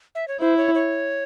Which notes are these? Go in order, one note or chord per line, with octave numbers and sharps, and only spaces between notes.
E5
C#5
E4 C5
C#5
C#5